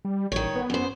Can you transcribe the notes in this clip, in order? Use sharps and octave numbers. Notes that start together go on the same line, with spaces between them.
G3
A1 D#3 C#5
B3
F#2 C5